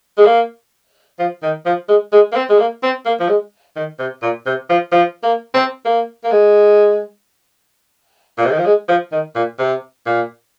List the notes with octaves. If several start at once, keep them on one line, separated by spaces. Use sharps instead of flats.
G#3
A#3
F3
D#3
F3
G#3
G#3
A#3
C4
G#3
A#3
C4
A#3
F3
G#3
D#3
C3
A#2
C3
F3
F3
A#3
C4
A#3
A#3
G#3
A#2
C3
D#3
F3
G#3
F3
D#3
A#2
C3
A#2